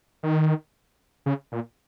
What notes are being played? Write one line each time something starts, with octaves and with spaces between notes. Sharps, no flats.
D#3
C#3
A#2